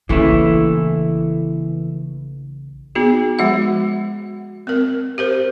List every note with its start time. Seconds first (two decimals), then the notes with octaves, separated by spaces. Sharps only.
0.09 A#1 C#3 E3 A3 E4
2.95 B3 D#4 F#4 G#4
3.39 F3 G#3 F#4 F#5
4.67 C4 A#4
5.18 G4 A#4 C5